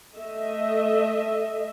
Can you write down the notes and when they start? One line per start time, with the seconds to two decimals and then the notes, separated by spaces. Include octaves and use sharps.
0.16 A3 D#5 E5